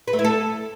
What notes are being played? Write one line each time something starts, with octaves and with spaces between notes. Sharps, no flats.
B4
A3
E4
A4